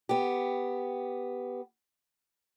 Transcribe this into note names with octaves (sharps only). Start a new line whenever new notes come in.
B3 G4